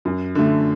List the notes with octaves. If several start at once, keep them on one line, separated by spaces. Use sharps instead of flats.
F#2
D3 A3